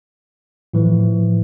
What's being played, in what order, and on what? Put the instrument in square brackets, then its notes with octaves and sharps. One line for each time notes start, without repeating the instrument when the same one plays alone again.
[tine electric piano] A2 E3 F3